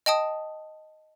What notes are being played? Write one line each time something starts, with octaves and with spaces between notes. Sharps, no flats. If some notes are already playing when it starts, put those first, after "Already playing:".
D#5 G5 A5 D#6